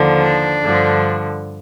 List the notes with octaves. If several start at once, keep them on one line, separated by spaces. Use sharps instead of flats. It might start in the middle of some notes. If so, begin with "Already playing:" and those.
Already playing: D#2 D3 F3
D4
G2 D3 F3